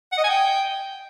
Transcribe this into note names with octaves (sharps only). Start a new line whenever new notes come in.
F#5
D#5
G#5
G5